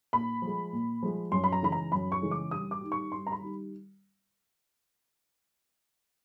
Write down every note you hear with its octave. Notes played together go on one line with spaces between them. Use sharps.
A#2 B5
F3 G#3
A#2
F3 G#3
F#2 C6
B5
A#5
C#3 E3 G#3 B5
A#5
F#2 B5
C#6
C#3 E3 G#3
D6
G2 D#6
D6
D#3 G3
C#6
G2 C6
A#5
B5
D#3 G3